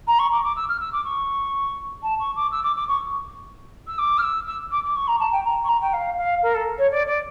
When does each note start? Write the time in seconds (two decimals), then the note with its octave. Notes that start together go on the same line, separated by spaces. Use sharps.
0.07 A#5
0.19 C#6
0.32 D6
0.44 D6
0.56 E6
0.68 F6
0.80 E6
0.92 D6
1.04 C#6
2.03 A5
2.19 C#6
2.35 D6
2.51 E6
2.63 D6
2.76 D6
2.88 C#6
3.87 E6
3.98 D6
4.18 F6
4.22 E6
4.47 E6
4.71 D6
4.84 D6
4.96 C#6
5.07 A#5
5.20 A5
5.32 G5
5.45 A#5
5.64 C#6
5.68 A#5
5.81 G5
5.93 F5
6.17 F5
6.42 A#4
6.54 A4
6.78 C#5
6.91 D5
7.07 D5